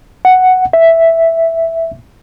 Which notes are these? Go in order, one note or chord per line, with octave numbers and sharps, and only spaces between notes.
F#5
E5